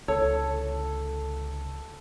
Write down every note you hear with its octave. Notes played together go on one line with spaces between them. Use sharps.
C#2 D3 A4 C#5